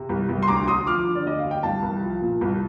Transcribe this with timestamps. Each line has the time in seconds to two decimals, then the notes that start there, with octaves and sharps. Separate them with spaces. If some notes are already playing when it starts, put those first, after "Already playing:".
Already playing: C3
0.09 C2
0.29 C2
0.43 C6
0.48 D2 A#5 D6
0.67 D2 C6 D#6
0.87 F3 D6 F6
1.06 D3
1.15 D5
1.26 D2 D#5
1.39 F5
1.44 D2
1.51 G5
1.63 C2 F5 A5
1.82 C2
2.02 F3
2.21 A#2
2.41 C2